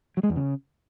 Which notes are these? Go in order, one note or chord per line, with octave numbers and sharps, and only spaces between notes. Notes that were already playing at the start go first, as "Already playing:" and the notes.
F#3
G#3
E2
C#3